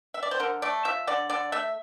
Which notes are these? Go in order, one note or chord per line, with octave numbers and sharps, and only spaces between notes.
E5
D5
C5
D3 A#4
A3 D5
F3 E5
D3 D5
D3 D5
A3 E5